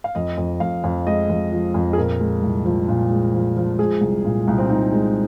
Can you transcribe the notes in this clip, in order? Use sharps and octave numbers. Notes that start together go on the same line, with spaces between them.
F5
F2 D#5
F2
F2 F5
F2
G#3 D#5
F2
F3
F2
G#4
A#2 A#4
G#3
C2
F3
A#2
G#3
F3
F3
G#3 G#4
C2
A#2
C2
C4
C2 D#4
G#3